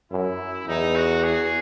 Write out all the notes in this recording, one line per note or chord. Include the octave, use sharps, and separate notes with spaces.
F#2 E4
E2 D#4
F#4
G#4